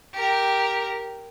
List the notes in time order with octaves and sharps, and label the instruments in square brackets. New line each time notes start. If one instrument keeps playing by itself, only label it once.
[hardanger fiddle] G4 A#4